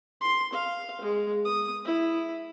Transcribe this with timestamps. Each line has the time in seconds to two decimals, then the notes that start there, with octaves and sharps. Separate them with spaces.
0.21 C6
0.53 F5
1.01 G#3
1.45 D#6
1.85 E4